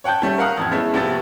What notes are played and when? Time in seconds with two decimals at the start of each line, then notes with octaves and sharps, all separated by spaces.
0.04 C#5 F#5 G5 A5 G6
0.22 G3 A3 C#4
0.38 A#4 F5 F#5 A#5 D#6 F6
0.57 A1 F2 G#6
0.71 G#3 A3 B3 C#4 E4
0.94 A#1 C3 A3 B3 A6